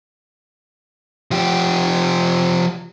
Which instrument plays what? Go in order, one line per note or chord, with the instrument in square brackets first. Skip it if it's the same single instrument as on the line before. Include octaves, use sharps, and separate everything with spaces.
[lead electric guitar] F3 G4